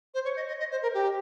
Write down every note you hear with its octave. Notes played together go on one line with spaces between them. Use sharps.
C5
C#5
D#5
D#5
D#5
C5
A#4
G4